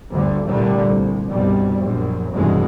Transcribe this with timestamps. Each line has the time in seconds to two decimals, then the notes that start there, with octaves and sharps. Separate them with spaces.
0.11 G1 D2 G2 D3
0.48 C2 A#2 D3 G3 A3
0.87 C2
1.30 C2 G2 B2 G3
1.79 A#1 F#2
2.33 F1 A#1 G2 B2 E3 G#3